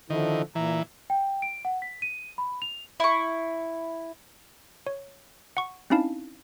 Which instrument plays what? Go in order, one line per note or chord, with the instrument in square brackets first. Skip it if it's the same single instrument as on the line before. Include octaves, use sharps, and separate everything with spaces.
[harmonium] D3 F3 E4 [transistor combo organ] D#3
[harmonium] A#2 A#5 [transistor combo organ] E3
[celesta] G5
D7
F#5
B6
D#7
B5
F7
[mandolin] E4 C#6
[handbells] C#5
F#5 C#6
C4 C#4 D#4 E4 F5 A5